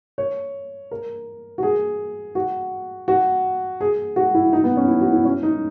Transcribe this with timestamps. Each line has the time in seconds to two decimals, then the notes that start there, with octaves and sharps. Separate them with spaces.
0.18 C#5
0.91 A#4
1.58 F#4
1.63 G#4
2.35 F#4
3.08 F#4
3.81 G#4
4.16 F#4
4.35 E4
4.53 D#4
4.64 B3
4.77 C#4
4.88 E4
5.01 F#4
5.13 E4
5.25 C#4
5.43 D#4